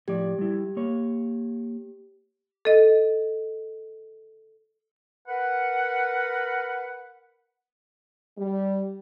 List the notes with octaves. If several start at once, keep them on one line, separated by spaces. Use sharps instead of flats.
A2 F3 G4 D5
G3 E4
A#3 C#5
A4 D#5
A#4 B4 F#5
G3